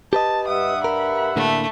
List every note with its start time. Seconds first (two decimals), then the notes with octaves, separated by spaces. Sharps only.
0.13 G4 B4 D#5 A5
0.48 G2 E5 F#5 D#6
0.84 A#4 B5
1.36 A2 D3 A3 A#3